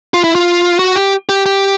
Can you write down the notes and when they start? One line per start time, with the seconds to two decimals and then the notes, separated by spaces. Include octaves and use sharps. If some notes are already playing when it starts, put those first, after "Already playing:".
0.14 F4
0.24 E4
0.35 F4
0.79 F#4
0.96 G4
1.29 G4
1.46 G4